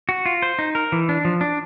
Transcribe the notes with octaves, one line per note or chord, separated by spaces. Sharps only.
F#4
F4
C5
D#4
A#4
E3
D4
F3
D4